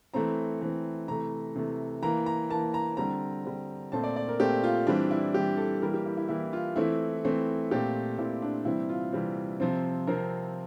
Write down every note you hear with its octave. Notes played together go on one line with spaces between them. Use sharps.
E3 A3 C4 A#5
E3 A3 C4
C3 E3 A3 A#5
C3 E3 A3
E3 A#3 A#5
A#5
E3 A#3 A5
A#5
D3 G3 C4 A#5
D3 G3 C4
A#2 A3 C4 A5
D5
D5
A#4
A#2 A3 C4 G4
F4
E3 G3 C4 D4
E4
E3 G3 C4 G4
A4
E3 G3 A#3 A#4
G4
E4
E4
E3 G3 A#3 E4
F4
E3 A3 C4 E4
E3 A3 C4
A#2 A3 C4 G4
A#2 A3 C4 E4
D4
C3 E3 G3 C4 E4
F4
C3 E3 G3 C4
C3 F3 C4
C3 F3 C4 A#4